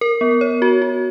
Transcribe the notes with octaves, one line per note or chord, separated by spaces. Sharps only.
A#4
B3
C#5
F#4
F#4